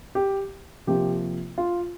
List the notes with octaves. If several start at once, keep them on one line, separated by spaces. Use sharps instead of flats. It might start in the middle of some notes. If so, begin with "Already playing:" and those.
G4
C3 F3 A#3 G4
F4